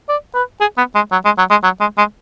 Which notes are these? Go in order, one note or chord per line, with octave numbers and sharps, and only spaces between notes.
D5
B4
G#4
B3
G#3
F#3
G#3
F#3
G#3
F#3
G#3
G#3